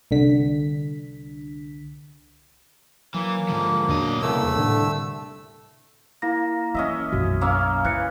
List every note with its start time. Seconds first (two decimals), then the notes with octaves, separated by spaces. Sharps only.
0.11 C2 D3 B6
3.14 E3 F#3 A#3
3.49 G#2 D3 F3
3.88 E2 A#2 F#3 D4 D#5
4.22 C2 C#3 E3 A3 A#3 E6
4.56 A2 D3
6.22 A#3 E4 A#6
6.75 E3 C#4 D#5 E5
7.12 B1 F#2 F#4
7.41 A#3 C#4 F5 D6 E6 F6
7.85 C#3 E3 F#6 C#7